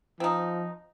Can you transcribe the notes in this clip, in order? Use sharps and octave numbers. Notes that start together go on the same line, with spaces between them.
F3 C4 D#4